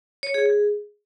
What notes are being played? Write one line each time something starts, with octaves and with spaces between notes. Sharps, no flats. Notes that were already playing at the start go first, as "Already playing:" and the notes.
C#5
G#4
G#4